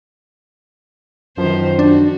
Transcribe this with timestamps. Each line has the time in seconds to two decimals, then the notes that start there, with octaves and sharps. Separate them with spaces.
1.38 F#2 D#3 F3 B4 C5
1.79 D4 F#4